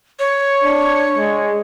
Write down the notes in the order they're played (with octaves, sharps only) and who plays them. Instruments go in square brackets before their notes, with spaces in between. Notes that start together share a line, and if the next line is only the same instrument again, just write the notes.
[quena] C#5
[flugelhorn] D4
G#3